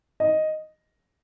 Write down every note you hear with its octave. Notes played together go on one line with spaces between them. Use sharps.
D#5